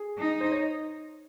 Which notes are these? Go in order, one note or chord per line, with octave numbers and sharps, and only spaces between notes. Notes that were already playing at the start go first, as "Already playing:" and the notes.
Already playing: G#4
D#4
C5
C#5